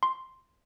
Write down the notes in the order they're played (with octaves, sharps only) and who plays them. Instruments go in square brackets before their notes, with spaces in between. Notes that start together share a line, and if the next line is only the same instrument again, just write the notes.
[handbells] C6